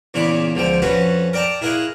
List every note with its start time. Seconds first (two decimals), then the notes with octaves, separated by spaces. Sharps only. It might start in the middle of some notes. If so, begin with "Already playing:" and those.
0.14 E2 A#2 C#3 D4 B5
0.55 C#2 D3 F3 G5
0.82 F2 C#4 F#4 A4 B4 C#5
1.33 A#4 D5 G5 A5 A#5
1.61 E4 G#4 A#4 F5 F#5 C#6